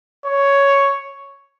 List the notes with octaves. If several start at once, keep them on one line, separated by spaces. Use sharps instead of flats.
C#5